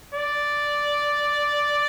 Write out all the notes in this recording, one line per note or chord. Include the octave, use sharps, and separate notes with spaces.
D5